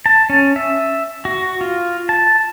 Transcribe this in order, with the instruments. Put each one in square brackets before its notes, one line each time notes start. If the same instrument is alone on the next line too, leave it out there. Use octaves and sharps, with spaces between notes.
[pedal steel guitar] A5
C#4
E5
F#4
F4
A5